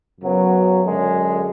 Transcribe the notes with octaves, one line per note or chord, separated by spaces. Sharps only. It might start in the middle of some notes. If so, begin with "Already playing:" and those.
F#2 C#3 F#3 B3
F#2 D3 G#3